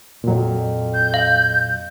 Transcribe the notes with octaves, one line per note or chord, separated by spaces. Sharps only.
F2 A#2 F#3
G6
F5